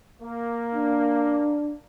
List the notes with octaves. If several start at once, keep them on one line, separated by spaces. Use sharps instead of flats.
A#3
D4